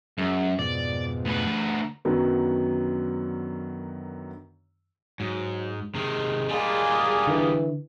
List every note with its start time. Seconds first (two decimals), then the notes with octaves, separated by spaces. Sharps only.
0.18 F#2 G#3
0.59 F2 G#2 B2 D5
1.25 D2 B4
1.57 A#5
2.05 F#2 D3 D#3 F#3 B3
5.20 G#2 F#3
5.95 C3 D#3 G#3
6.48 G3 A#3 D4 F4 G#4
7.27 D3 E3